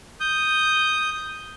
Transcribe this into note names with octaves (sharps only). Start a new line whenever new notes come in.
D#6 G6